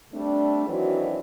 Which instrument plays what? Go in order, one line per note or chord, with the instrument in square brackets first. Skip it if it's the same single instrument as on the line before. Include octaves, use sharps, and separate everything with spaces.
[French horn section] G3 A3 C4 D4
D#3 E3 F#3 C4 D4 F#4